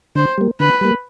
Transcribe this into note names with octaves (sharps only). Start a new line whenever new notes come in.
D3 C5
G3 A#3
D3 B4
G3 A#3